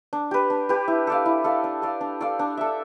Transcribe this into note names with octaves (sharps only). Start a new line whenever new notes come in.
D4
G4 B4
D4
G4 B4
E4
A4 D5 F5
E4
A4 D5 F5
D4
A4 D5 F5
D4
A4 D5 F5
D4
A4 E5